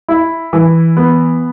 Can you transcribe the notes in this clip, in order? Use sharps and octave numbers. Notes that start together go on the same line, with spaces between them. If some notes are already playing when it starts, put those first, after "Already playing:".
E4
E3
B3